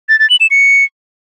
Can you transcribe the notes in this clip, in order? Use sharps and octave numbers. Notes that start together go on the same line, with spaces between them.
A6
A6
F#7
E7
C#7